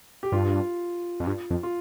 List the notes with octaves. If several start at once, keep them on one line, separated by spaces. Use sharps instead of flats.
G4
G2 F4
F2
G2
F2
F4